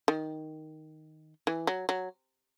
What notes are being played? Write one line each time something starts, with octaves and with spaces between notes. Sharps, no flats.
D#3
E3
F#3
F#3